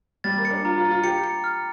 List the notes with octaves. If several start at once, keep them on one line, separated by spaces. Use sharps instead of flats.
G3 A6
A#3
C#7
D4
F4 A#5
F4
A6
F4
G4 C#7
C#7
F6